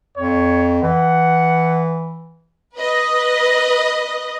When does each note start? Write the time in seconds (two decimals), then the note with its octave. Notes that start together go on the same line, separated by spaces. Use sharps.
0.17 F2 C#5
0.82 E3 F#5
2.76 B4 D#5